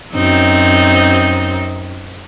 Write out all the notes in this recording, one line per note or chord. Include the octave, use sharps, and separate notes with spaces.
F#2 C4 D#4